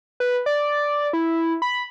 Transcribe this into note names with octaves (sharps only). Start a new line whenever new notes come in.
B4
D5
E4
B5